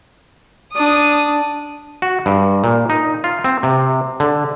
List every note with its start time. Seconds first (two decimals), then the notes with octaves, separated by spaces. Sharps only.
0.76 D4 D#6
2.02 F#4
2.26 G2
2.64 A#2
2.90 D#4
3.24 F4
3.44 C4
3.63 C3
4.20 D3